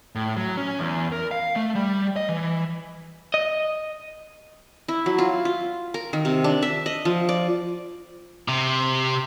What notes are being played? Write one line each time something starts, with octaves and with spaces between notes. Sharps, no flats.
A2
F#3
C#4
E2
A#4
F5
A3
G3
D#5
E3
D#5
E4
F#3
F4
F4
A#4
D#3
C3
D4
E5
D#5
F3
D5
C3